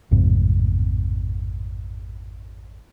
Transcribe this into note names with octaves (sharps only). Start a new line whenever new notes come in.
A1 F2 G#2 C3